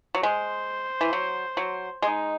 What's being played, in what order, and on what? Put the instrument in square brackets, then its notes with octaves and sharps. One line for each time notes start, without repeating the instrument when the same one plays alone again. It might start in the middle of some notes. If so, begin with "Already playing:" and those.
[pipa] F#3
[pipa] G#3 [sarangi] C5
[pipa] E3
F#3
F#3
[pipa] G#3 [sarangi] D#4